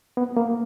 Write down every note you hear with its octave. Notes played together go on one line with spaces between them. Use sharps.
B3
A#3